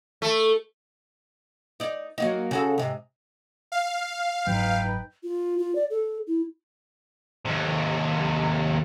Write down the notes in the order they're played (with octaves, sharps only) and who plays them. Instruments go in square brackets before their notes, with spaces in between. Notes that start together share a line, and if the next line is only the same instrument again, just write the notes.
[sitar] A3
[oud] D#4 D5
F#3 A#3 D#4
C#3 F#4 A4
G#2 C3
[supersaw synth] F5
[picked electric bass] F#1 G#2 F#3 [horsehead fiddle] D#4 B4 [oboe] G5
[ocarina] F4
F4
D5
A4
E4
[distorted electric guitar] D#2 C3